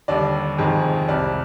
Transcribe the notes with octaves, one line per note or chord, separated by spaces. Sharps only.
D#2 D3 G3 D5
F2 C3 D#3 G#3
C2 C3 G3 D5